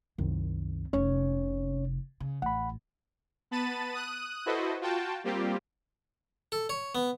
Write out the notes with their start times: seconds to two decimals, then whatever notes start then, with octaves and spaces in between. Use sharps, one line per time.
0.18 C2 F#2 D#3 C4
0.93 F1 C3 C#4 C#5
2.20 C#3
2.42 A1 F#5 B5
3.51 B3 A5 B5 A6 D#7
3.94 D#6 F#6 D#7
4.46 E4 F#4 A4 B4 C5 D#5
4.81 F4 F#4 G5 A5
5.24 G3 A#3 C4 F4 G4
6.52 A4
6.69 C#5
6.95 B3